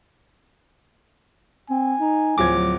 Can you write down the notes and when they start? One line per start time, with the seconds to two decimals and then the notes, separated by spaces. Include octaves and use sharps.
1.70 C4 G#5
2.00 D#4
2.38 D1 F3 F#3 D6 G#6